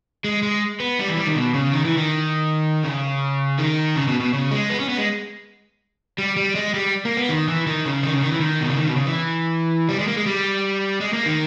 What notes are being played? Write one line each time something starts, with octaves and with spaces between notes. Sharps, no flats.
G#3
G#3
B3
G3
E3
G3
D#3
B2
C#3
D#3
E3
D#3
C#3
D#3
C#3
B2
B2
C#3
G#3
B3
C#4
B3
G#3
G3
G3
G#3
G3
A#3
B3
D#3
E3
D#3
C#3
D#3
C#3
D#3
E3
D#3
B2
C#3
D#3
B2
C#3
E3
G3
G#3
A#3
G#3
G3
G#3
A#3
D#3